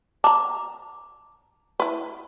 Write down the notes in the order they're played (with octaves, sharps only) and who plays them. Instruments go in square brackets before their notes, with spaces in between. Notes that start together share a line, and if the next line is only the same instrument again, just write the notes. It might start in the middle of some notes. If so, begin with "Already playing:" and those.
[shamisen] A5 A#5 [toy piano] D6
[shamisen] E4 B4